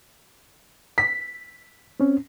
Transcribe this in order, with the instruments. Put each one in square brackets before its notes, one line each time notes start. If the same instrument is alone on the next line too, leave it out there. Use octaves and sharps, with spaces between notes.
[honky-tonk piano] B6
[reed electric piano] C4 C#4